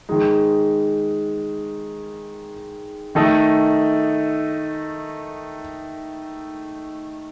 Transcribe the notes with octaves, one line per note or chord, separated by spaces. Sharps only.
D#3 G#3 D#4
D#3 A3 D#4 A4 D#5